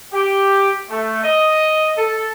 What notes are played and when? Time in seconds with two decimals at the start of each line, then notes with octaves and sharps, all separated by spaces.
0.13 G4
0.89 A3
1.23 D#5
1.97 A4